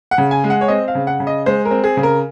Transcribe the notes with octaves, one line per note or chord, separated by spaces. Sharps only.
F#5
C#3
G#5
G#3
F#5
C#5
C4 D#5
F5
C#3
F#5
C#3
D#5
G#3 C5
A#4
C4
G#4
C#3
A#4